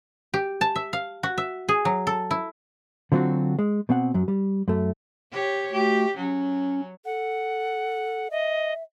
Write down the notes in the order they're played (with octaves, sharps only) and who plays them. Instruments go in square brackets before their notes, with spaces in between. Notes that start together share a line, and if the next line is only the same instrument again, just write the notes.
[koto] G4
A5
E5
F5
F#4
E5
G#4
F#3
A4
E4
[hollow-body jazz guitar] D3 F#3 C4 F4 F#4
G#3
B2 C4 F#5
F#2 F#3
G3
F#2 A3
[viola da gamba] G4 C#5
[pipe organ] A3 F#4 [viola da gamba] G4
[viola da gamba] F#3 [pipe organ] C#4
[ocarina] A4 [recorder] F#5
[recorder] D#5 [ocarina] E5